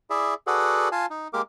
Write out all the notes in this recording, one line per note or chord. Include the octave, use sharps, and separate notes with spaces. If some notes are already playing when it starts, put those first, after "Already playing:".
E4 G#4 D5 E5
F#4 G#4 A4 B4 D5 F#5
F4 F5 G#5 A5
D#4
G#3 A#3 G4 A#4 D6